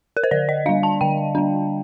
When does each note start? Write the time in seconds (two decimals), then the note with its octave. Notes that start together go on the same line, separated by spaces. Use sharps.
0.17 A#4
0.24 C5
0.31 D3 D5
0.49 D#5
0.66 G3 D4 F5
0.83 A5
1.01 D3 G5
1.35 G3 D4